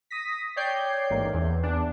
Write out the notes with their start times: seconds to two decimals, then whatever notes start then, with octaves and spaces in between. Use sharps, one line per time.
0.10 D#6 A#6 B6
0.56 C#5 D5 G5 G6 G#6 C7
1.10 A1 G#2 A#3
1.34 E2
1.63 E2 D4